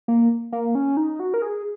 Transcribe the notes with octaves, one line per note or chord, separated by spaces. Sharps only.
A#3
A#3
C#4
D#4
F#4
A#4
G#4